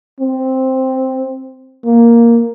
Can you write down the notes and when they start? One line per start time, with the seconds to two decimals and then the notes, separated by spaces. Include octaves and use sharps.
0.21 C4
1.85 A#3